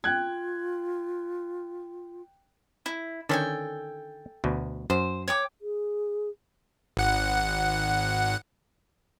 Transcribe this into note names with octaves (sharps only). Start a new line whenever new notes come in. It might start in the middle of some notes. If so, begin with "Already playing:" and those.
F4 G5 F#6 G#6
E4
D3 D#3 C#4 A4 G5 G#5
D2 B2
F#2 C5
C#5 G5 D6
G#4
G#1 F#5